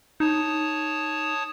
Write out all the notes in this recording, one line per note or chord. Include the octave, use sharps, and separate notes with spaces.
D#4 C#5 A5 D#6